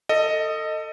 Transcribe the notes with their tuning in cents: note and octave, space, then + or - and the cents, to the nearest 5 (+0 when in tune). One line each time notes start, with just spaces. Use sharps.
A4 +25 D#5 +0